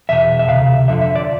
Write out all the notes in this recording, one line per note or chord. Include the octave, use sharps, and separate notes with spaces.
E2 B2 E5
E5
D2 C3 F5
F2 D3 F3 E5
E5
D5